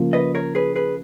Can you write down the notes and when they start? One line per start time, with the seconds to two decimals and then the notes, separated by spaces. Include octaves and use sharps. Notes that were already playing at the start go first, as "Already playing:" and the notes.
Already playing: C#3 F3 A#3
0.13 B4 D#5
0.35 A#4 C#5
0.55 G#4 B4
0.75 G#4 B4